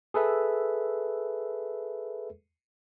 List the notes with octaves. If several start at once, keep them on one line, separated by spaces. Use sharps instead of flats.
G#4 A4 B4 E5